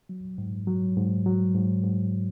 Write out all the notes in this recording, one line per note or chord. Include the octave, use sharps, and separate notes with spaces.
F#3
G#2
F#3
G#2
F#3
G#2
G#2